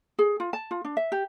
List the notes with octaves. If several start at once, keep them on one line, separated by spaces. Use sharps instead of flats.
G#4
F4
A5
F4
D4
E5
G4